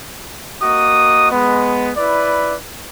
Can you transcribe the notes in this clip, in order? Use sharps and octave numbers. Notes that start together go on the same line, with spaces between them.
A#3 F#4 D#5 D#6
G#3 B3
E4 B4 D5